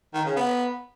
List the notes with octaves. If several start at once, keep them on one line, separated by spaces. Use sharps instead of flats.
D#3
C#3
B3